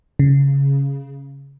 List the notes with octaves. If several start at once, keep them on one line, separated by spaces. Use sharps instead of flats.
C#3